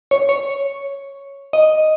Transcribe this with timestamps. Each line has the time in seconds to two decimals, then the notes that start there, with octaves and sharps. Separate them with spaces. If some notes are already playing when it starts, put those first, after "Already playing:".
0.11 C#5
0.29 C#5
1.53 D#5